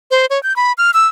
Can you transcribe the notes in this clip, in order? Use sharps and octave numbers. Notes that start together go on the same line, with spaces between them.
C5
C#5
G6
B5
F6
E6